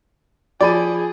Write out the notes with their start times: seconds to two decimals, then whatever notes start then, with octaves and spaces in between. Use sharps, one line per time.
0.61 F3 G#4 D5 B5 D#7